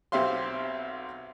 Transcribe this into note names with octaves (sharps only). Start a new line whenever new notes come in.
B1 C4 G4 E5 F5 C6